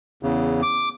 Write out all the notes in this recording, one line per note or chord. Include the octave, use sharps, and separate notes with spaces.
E2 C#3
D6